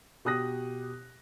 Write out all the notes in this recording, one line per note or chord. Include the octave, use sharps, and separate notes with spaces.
B2 G4 D#6 F#6 A#6